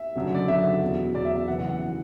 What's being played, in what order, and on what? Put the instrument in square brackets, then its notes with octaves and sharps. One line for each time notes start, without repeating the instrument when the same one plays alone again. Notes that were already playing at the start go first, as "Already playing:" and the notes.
Already playing: [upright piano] E5
F#1 F#2 D3 F#3
D5
F#1 F#2 D3 F#3 E5
E2 B2 F#3
E2 B2 F#3 D5
E5
E5
F#1 E2 E3 F#5
F#5
F#5
E3